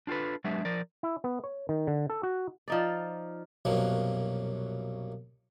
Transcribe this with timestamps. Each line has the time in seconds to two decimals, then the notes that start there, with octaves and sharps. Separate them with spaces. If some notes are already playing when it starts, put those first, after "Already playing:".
0.07 D4 F4 G4 A4 B4
0.44 F#3 G#3 B3 D4 G4 E5
0.65 F3 A#4 D5
1.03 E4
1.24 B3
1.44 C#5
1.69 D#3
1.87 D3
2.10 A4
2.23 F#4
2.68 F3 D#4 D5
3.65 C2 F#2 B2 F3 F#3 A#3